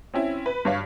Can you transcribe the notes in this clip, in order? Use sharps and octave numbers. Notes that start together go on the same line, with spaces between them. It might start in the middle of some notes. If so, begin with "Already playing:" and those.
C4 C#4 E4
B4
G2 C#5 F5